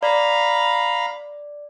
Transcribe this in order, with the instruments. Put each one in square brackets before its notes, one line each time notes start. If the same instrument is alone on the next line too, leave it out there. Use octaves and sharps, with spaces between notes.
[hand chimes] D5 [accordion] F5 A#5 B5